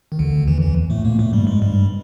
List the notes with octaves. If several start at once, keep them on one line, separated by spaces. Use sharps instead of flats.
D#3
D2 D3
E2 E3
E2 E3
A2 A3
A#2 A#3
A2 A3
G2 G3
G#2 G#3
G2 G3